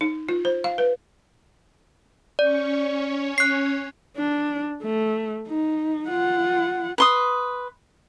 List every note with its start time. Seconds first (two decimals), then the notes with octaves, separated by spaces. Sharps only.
0.01 D#4
0.29 F4
0.45 C5
0.64 F5
0.78 B4
2.39 C#4 C#5 D5
3.38 F#6 C7
4.17 D4
4.83 A3
5.48 D#4
6.08 F4 F#5
6.98 B4 C6 D#6